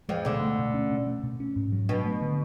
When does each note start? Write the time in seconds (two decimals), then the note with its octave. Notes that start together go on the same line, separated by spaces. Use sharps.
0.09 F2 F3 G#3
0.25 D2 B2 D3
0.42 A3
0.59 B2
0.74 C#4
0.91 B2
1.07 A3
1.23 B2
1.40 C#4
1.56 G#2
1.72 F#3
1.89 B2 D4
2.05 A3
2.21 D3